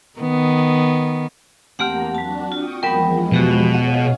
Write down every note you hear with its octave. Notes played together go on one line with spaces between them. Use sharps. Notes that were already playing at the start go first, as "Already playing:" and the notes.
D#3 B3
E2 A3 A#3 C4 G4 F#5 A#5 F6
F#3 D4 F#4 A5
F4 G5 C#6 D#6
E2 F3 F#3 G#3 B3 A#4 G5 B5
B2 F#4 G4 B4
G#4 C#5 D#5 F5 F#5 C#7